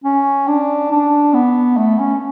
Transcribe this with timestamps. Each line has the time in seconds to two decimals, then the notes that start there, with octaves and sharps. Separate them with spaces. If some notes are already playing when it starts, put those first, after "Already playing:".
0.04 C#4
0.48 D4
0.92 D4
1.34 B3
1.77 A3
1.99 C#4